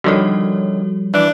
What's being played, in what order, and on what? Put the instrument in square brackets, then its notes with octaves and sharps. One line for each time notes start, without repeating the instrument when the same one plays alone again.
[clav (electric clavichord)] D3 D#3 [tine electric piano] F3 G3 [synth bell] F#4 A4 C#5
[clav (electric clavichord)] E3 [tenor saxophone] D4